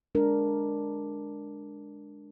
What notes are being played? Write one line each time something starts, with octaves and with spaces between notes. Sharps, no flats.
G#3 D4 A#4